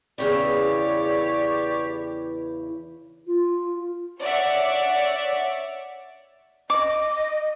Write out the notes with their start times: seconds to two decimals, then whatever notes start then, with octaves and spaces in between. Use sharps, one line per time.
0.18 E2 C#3 E3 G4 C#5 D5
3.27 F4
4.20 C#5 D5 E5 F#5
6.70 D#5 D6